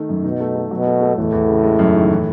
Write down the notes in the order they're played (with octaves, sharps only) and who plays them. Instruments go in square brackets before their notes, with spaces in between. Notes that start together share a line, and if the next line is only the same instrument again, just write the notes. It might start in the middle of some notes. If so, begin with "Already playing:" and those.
Already playing: [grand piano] D#3 A3
F#2
[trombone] B2 [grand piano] D#4
[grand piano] A3
A3
[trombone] B2 [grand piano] F#3
[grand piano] A3
A3
[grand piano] E2 [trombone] A2
[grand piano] E2
C#3
G#3
F#2
D#3
E3